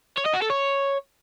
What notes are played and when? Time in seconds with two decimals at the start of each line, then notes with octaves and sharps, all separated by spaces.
0.18 C#5
0.26 D#5
0.34 F#4
0.42 A4
0.50 C#5